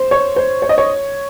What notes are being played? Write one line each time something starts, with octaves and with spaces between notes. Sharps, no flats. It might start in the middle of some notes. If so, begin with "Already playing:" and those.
Already playing: C5
C#5
C5
C#5
D#5
C#5